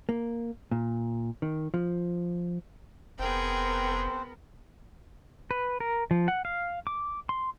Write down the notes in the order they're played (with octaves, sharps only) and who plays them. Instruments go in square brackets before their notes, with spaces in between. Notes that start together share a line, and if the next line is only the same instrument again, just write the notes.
[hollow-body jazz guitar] A#3
A#2
D#3
F3
[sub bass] F1 [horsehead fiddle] B3 A#4 [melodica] C4 C5 [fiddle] G#4 G5
[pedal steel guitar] B4
A#4
F3
F#5
F5
D6
C6